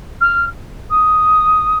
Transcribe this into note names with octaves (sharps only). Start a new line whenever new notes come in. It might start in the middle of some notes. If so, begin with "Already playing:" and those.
F6
D#6